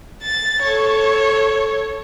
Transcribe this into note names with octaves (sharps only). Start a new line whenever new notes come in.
A6
A4 C#5